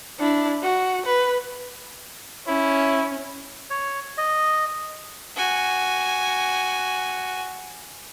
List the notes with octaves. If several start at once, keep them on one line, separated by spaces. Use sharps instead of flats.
D4 E4
F#4
B4
C#4 E4
C#5
D#5
F#4 G#5